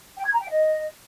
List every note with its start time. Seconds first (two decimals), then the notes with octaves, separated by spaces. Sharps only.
0.17 G5
0.25 G#6
0.33 A#5
0.40 G5
0.48 D#5